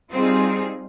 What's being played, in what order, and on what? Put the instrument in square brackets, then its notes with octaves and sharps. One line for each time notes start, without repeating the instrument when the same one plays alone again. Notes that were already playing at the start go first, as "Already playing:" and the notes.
[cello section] G3 C4 D#4 F4 G#4